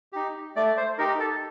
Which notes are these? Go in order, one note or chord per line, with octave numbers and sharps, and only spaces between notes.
D#4 G4
A3 D5
C5
D#4 G4 A#4
A4